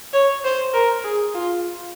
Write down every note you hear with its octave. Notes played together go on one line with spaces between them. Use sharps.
C#5
C5
A#4
G#4
F4